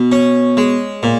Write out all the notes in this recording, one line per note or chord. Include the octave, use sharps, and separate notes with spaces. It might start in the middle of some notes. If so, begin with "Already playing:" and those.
Already playing: B2
C#4
G#3
A#2